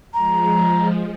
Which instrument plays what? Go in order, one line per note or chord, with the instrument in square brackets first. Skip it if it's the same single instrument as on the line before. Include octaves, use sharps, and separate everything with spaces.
[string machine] F3 G#3 [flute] A#5